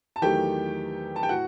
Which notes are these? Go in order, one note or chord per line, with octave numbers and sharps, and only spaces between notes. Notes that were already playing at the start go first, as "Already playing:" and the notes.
A5
E2 D#3 F#3 A3 G4 G5
A5
G5
A2 F#4 F#5